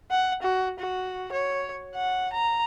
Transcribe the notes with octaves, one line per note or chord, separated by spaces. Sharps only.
F#5
F#4
F#4
C#5
F#5
A#5